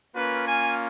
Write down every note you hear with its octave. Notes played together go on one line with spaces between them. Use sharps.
A#3 C#4 F4 B4
G#5